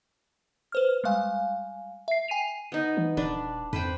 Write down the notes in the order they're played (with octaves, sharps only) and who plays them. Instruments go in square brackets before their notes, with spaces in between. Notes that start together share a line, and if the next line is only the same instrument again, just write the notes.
[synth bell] B4 C5 F6
G3 G#3 F5 G#5
E5 C7
G5 G#5 C7 D#7 F7
[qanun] B3 D#4
[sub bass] E3
[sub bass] D#1 [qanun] D4 B4
[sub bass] F2 [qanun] B4 C5 G5